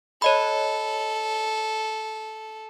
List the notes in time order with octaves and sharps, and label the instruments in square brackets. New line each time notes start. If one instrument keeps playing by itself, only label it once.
[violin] A4 [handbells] C#5 D#5 B5